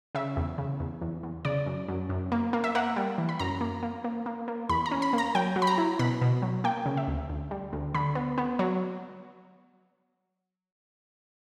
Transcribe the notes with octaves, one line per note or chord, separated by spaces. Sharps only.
C#3 E5
E2
C#3
E2
E2
E2
C#3 D5
F#2
F#2
F#2
A#3
A#3
E5
A#3 F#5
G3
E3
B5
F#2 A#5
A#3
A#3
A#3
A#3
A#3
E2 B5
A#5
C#4
B5
A#3
A#5
F#3 G5
F#3
B5
A#5
E4
B2 B5
B2
F#3
A#3 G5
C#3
E5
D2
D2
G3
D2
D3 B5
B3
B3
F#3